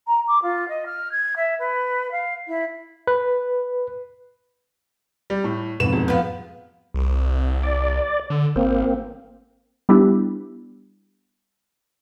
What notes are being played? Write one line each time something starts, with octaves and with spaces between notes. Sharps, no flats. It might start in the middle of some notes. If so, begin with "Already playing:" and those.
A#5
D6
F4
D#5
F6
G#6
E5
B4
F5
E4
B4
G3
A2
F2 G#2 B2 B4 E7
E1
F3 B3 B4
C2
D5
D3
G#1 A#3 C4
G3 B3 D4 E4 G4